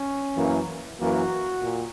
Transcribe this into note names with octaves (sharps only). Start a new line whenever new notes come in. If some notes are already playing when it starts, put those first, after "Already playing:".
Already playing: C#4
F#2 E3 A#3
F#2 E3 A#3 F#4
A#2